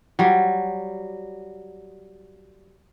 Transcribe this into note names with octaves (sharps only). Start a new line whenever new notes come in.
F#3 G3